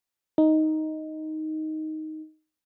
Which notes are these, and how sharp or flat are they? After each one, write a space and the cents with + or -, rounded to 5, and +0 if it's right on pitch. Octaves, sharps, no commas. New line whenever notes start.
D#4 +5